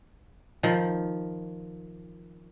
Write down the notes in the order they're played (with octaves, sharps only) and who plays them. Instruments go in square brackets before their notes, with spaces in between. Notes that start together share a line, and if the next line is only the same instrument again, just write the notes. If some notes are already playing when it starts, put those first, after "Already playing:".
[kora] D#3 F3